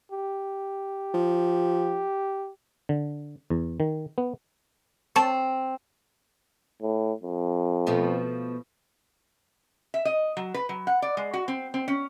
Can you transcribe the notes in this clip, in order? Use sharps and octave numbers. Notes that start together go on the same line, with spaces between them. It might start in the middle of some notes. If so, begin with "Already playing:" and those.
G4
F3
D3
E2
D#3
B3
C4 C#5 A5 C#6
A2
F2
B2 F3 A3
E5
D#5
F#3
B4
F#3
F#5
D5
G#3
F#4
C4
C4
C#4